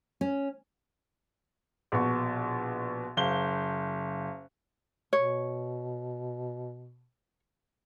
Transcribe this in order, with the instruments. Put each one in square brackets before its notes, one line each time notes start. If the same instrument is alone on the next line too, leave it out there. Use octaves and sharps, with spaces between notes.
[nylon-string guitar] C#4
[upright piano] A#1 B2 C#6
F#1 F5 G7
[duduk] B2 [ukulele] C#5